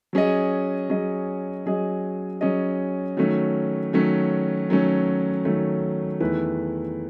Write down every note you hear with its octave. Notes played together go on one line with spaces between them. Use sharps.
F#3 C#4 G#4 D#5
F#3 C#4 G#4 D#5
F#3 C#4 G#4 D#5
F#3 C#4 G#4 D#5
D#3 F#3 A3 C#4
D#3 F#3 A3 C#4
D#3 F#3 A3 C#4
D#3 F#3 A3 C#4
E2 D#3 A3 E4 B4